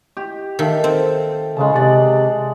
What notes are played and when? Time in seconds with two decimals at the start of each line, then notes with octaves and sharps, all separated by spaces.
0.17 G4
0.59 D#3 A4 E5 F5
0.84 C4
1.57 C#3 G#3 A5
1.74 C3 D5 F#5